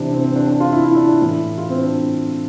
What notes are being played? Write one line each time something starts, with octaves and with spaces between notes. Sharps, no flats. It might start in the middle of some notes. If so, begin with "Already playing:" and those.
Already playing: C3 E3 D4
C4
C4
D4
D4
F4
E4
E4
D4
D4
A2 E3 E4
F4
C4
D4